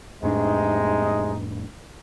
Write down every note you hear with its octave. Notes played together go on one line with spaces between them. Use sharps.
F2 A2 C3 G#3 D4 D#4